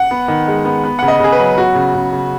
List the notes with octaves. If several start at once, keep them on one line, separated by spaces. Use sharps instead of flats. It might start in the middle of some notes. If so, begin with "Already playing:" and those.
Already playing: F#5
B3
D#3
G#3
B3
B3
C#3 F#5
D#5
C#3 G#4
B4
F#3
B3 F#4
C#3
C#3
C#3